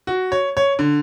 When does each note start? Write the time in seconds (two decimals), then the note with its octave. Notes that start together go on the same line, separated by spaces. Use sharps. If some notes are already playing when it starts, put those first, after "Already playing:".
0.07 F#4
0.32 C#5
0.57 C#5
0.79 D3